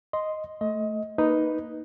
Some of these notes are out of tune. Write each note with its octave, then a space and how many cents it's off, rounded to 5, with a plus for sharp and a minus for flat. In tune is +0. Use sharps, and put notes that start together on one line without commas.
D#5 +0 C6 -5
A3 +0 D#5 +20
A#3 -5 D#4 +0 B4 +0